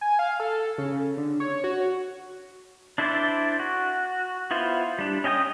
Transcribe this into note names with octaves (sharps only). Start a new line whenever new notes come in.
G#5
F5
A4
C#3
D3
C#5
F#4
D4 E4 A4 C5 D5
F#4
B3 E4 F4 C5
G3 D4
C#4 D#5 G5 G#5 D#6